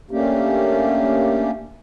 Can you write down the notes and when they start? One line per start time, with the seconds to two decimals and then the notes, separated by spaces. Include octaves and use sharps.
0.11 A3 A#3 C#4 D4 G4